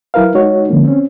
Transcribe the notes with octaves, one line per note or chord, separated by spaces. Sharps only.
F#3 E4 A#4 B4 F5
G#3 D#4 F#4 C#5
D3 F3 G#3 A#3 C#4
C4 C#4